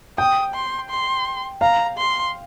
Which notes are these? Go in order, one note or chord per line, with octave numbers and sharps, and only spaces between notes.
G5 D#6
C6
C6
F5 A#5
C6